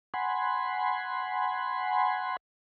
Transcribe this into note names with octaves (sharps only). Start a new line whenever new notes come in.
F#5 G#5 B5 C6